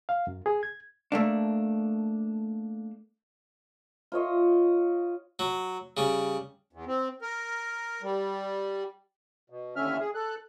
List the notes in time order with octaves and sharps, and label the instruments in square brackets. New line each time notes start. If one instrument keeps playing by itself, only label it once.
[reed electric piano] F5
F#2
G#4
G#6
[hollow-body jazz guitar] A3 A#3 D4
[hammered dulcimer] F4 C#5 D#5
[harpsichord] F#3
C#3 G3
[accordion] E2
C4
A#4
G3
B2
D#2 A2 D3 C#4 E5 F6
G#4
A4 F#6